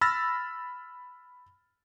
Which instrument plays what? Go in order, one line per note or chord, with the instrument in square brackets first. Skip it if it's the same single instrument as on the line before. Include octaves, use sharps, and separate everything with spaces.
[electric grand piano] B5 E6 F6 A6 A#6